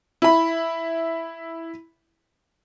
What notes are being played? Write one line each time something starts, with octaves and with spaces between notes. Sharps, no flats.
E4 B5